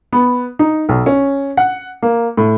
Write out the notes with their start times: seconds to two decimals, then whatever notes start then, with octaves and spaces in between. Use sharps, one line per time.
0.13 B3
0.59 D#4
0.89 B1
1.06 C#4
1.57 F#5
2.02 A#3
2.37 A2